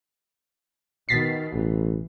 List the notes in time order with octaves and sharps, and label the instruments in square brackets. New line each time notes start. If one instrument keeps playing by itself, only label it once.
[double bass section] B2 D#3 [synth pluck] A6 B6 C7
[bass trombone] A1 [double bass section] E3